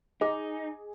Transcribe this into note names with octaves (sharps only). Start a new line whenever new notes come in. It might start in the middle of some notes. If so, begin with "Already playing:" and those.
D#4 G#4 D#5 D6